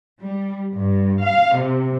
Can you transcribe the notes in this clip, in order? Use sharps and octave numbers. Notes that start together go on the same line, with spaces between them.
G3
G2
F5
C3